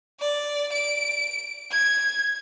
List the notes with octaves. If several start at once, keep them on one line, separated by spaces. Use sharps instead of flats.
D5
D7
G#6